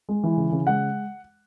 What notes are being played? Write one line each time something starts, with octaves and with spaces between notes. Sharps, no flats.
G#3
E3
C#3
C#3
G#3 F#5